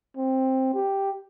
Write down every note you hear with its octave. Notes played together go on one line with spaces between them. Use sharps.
C4
G4